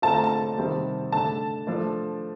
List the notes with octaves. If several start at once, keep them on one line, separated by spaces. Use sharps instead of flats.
D3 A3 C4 F4 A5
A#5
A5
C3 D#3 G3 C4
D3 A3 D4 A5
F3 A3 D4 F4